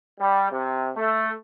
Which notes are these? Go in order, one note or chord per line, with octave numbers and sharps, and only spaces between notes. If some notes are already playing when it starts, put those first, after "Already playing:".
G3
C3
A3